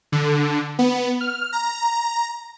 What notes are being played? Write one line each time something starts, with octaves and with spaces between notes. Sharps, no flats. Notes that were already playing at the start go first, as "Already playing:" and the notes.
D3
B3
F6
A#5